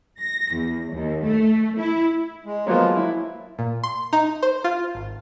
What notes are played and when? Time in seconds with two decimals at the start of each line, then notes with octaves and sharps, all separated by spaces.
0.21 A#6
0.53 E2
0.93 D#2
1.25 A3
1.77 E4
2.45 G#3
2.67 F3 F#3 G#3 A#3 B3 F4
2.97 F#3 A#3 E4
3.59 A#2
3.83 C6
4.13 D#4
4.43 C5
4.64 F4
4.95 G#1